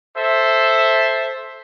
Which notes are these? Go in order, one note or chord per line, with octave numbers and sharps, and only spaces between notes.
A4 C5 E5